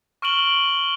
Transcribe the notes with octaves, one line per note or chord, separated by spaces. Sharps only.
C#6 F6 D7 E7 F#7 G7